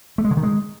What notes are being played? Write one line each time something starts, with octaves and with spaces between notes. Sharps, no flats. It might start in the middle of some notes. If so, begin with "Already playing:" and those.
A3
G#3
D3
D#3
G#3